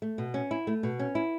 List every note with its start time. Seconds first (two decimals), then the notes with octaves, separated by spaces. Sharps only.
0.02 A3
0.18 B2
0.34 C#4
0.51 E4
0.67 A3
0.83 B2
0.99 C#4
1.15 E4